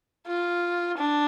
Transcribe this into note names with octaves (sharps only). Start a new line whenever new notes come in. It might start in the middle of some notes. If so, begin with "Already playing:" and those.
F4
D4